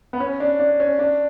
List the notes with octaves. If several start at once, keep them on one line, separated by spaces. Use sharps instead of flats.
B3
C#4
D4
D4
C#4
D4